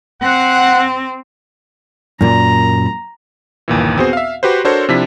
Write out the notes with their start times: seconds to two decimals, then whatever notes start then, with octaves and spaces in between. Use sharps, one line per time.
0.22 C4 F#5
2.21 F#2 A#2 A#5
3.68 G1 D#2 A#2 E3
3.98 B3 C4 F#4 G#4 C5
4.13 E5 F5
4.43 F#4 G4 B4 C5
4.65 D4 F#4 A4 A#4 C5 C#5
4.89 C3 F3 D4 E4 B6